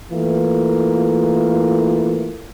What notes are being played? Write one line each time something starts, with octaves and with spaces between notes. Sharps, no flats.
E3 A3 A#3 F4